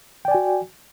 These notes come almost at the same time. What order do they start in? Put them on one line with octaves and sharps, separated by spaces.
G5 D5 G#5 F#4